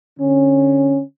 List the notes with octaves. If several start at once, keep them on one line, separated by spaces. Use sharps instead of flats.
D3 C#4